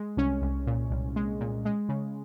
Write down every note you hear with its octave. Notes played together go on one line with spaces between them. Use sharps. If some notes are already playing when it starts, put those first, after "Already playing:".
Already playing: G#3
C2 C#4
C2
A#2
C2
G#3
A#2
G#3
C#3